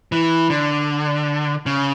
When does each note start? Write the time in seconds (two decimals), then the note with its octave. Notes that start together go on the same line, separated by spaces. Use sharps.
0.12 E3
0.50 D3
1.66 C#3